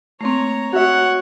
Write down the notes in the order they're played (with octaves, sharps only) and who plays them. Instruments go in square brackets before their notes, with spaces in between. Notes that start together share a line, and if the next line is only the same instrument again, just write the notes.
[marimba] A3 A#3 C4 [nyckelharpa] C#5 A#5
[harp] F#4 E5 [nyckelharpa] C#5 F#5